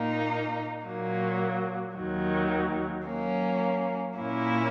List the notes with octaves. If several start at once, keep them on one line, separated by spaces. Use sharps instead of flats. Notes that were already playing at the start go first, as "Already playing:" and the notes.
Already playing: A#2 A#3 D#4
A#2 F#3 A#3
D#2 D#3 F#3
F#3 A#3 C#4
A#2 A#3 C#4 E4